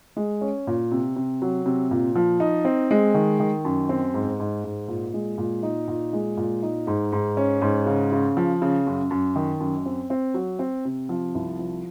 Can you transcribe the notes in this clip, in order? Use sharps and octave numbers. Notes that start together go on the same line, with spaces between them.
G#3
C#4
A#2
C3
C3
F#3
C3
A#2
F3
D#4
C4
G#3
D#3
D#3
F#2
C4
G#2
G#2
G#2
A#2
G#3
A#2
D#4
A#2
G#3
A#2
D#4
G#2
G#2
C#4
G#2
C#3
C#3
F3
C#3
F#2
F#2
D#3
F#2
C4
C4
F#3
C4
C3
F3
C2
F3